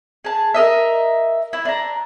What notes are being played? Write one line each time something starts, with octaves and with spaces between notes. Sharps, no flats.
G#4 A5
A#4 D#5 E5
E4
D4 A#5